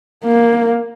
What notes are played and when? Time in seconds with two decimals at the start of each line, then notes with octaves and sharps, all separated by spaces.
0.25 A#3